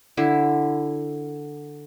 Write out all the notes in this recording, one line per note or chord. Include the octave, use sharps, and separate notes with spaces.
D3 E4